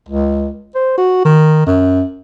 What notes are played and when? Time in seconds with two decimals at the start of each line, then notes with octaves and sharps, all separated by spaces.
0.09 C#2
0.75 C5
0.97 F#4
1.25 D#3
1.66 F#2